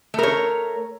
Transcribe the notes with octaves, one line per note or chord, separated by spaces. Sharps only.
A3 A#4 C#5